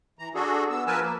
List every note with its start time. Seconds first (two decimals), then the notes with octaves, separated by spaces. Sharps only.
0.19 E3 A#5
0.35 D4 F#4 G#4 A4
0.71 B3 E6
0.87 F3 A#4 B4 G#5 A5 E6
1.02 A#3